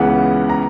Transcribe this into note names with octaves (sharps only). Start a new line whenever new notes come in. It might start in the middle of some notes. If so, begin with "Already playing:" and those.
Already playing: C#2 C#3 E3 B3 F#5
A#5